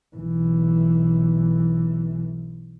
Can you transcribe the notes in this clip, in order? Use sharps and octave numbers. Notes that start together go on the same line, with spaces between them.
B1 E3